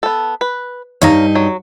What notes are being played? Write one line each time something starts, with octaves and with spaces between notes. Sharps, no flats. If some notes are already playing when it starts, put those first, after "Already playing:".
B3 A4
B4
G2 D#4 C#5 F5 A#5
F#3